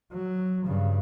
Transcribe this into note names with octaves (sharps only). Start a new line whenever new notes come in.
F#3
G2 C#3